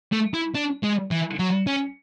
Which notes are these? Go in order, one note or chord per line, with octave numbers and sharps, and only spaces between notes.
A3
E4
D4
G#3
E3
F#3
C#4